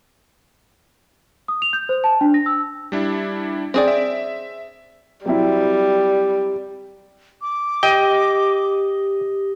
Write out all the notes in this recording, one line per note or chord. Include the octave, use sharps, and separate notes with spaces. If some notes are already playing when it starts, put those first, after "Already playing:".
D#6
F7
G6
C5
A5
D4
A#6
E6
G3 D4 E4
C4 G#4 D5
E5
F#3 G3 C4 E4
D6
G4 D#5 G5